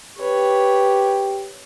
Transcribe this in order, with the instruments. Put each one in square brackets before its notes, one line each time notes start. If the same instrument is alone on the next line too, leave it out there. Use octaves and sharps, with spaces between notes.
[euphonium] G4 [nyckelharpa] B4 C#5